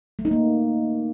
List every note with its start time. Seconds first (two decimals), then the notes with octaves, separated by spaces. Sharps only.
0.19 A3
0.25 D#4
0.31 A#3